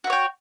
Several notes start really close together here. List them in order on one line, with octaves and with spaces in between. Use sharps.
F#4 E5 C#5 G5